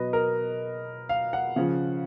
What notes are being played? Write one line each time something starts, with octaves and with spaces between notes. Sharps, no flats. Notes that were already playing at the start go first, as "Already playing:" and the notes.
Already playing: B2 F#3 B4 D#5
A#4
F5
F#5
C#3 F3